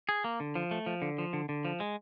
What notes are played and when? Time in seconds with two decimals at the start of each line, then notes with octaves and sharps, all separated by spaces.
0.09 G#4
0.24 A#3
0.40 D3
0.55 F3
0.71 A3
0.86 F3
1.02 D3
1.18 F3
1.33 D3
1.49 D3
1.65 F3
1.80 G#3